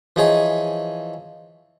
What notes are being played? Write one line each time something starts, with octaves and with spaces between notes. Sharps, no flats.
E3 F3 D#4 G#4 C#5 G#5